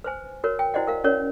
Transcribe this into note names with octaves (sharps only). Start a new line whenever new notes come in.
B4 C5 G#5
F#4 A#4 B4 C#5
G5
E4 F#4 C5 D5 D#5 F#5
A#4 F5
C#4 F#4 A#4 C#5 D5